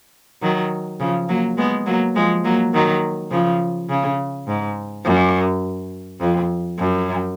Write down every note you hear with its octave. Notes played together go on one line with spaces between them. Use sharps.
D#3 F#3
C#3 F3
F#3 A#3
G#3 B3
F#3 A#3
F3 G#3
F#3 A#3
D#3 F#3
C#3 F3
C#3
G#2
F#2
F2
F#2